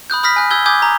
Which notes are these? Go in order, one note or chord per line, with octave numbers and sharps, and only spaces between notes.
B5 D#6 F#6 G6
B5 D#6 F6 A#6 B6
G#5 F#6
E6 G6 G#6 G7
G#5 D6 D#6 G6 G#6
A#5